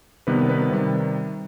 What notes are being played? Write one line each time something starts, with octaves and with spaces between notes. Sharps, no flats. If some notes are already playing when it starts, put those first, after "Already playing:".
C3 D#3 G3 B3 B4
B3 B4
C3 D#3 G3